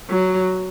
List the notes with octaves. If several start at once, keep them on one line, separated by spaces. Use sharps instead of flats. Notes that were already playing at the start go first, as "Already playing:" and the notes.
F#3